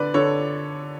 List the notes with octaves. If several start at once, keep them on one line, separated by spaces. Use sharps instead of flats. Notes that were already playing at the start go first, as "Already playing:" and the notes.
Already playing: D3 B4 D5
D3 A4 C#5